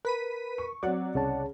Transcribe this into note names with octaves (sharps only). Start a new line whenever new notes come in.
A#4 B4 B6 D#7
C#6
F#3 C4 D5 F#5
C2 C#3 C#5 A5